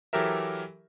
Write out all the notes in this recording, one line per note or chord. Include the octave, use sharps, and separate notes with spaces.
E3 F#3 G4 A4 A#4 E5